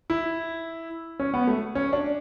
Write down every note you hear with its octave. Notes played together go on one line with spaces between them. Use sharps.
E4
C#4
B3
A3
C#4
D4